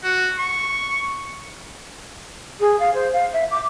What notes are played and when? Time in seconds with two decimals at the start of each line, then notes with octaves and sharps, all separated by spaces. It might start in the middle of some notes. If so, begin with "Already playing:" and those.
0.04 F#4
0.39 C#6
2.60 G#4
2.79 F5
2.94 C5
3.13 F5
3.33 E5
3.51 D6